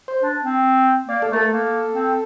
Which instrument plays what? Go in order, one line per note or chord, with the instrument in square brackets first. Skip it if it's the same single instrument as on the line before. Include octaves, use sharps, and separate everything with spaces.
[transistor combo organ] C5
[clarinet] D4
C4
[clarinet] A#3 [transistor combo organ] D5
[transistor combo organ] A4
[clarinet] A3 [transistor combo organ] A#4
[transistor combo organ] A4
[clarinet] A#3
C4